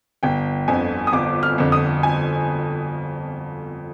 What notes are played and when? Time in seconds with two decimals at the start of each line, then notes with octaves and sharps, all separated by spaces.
0.23 G1 G5
0.68 F2 D3 G#5
1.07 D#6
1.13 G1 D6
1.43 F6
1.58 F2 D3
1.72 D#6
2.03 G#5